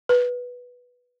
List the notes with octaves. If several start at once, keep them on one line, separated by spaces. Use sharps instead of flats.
B4